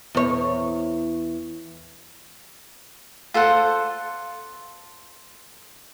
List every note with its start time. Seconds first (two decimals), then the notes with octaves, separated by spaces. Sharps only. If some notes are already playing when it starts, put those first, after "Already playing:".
0.15 E2 C#5
3.34 F4 A4 C5 F#5